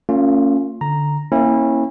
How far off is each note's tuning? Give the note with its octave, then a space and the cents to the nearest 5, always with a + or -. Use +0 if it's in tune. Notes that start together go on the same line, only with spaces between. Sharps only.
A#3 -45 C#4 +0 F4 +10
D3 +0 A#5 +0
A#3 +0 C#4 -35 E4 -20